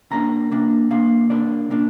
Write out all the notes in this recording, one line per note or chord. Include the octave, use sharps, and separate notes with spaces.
C3 A#3 D4 A#5
C3 A#3 D4
C3 A#3 D4 F5
C3 A#3 D4 D5
A#2 A#3 D4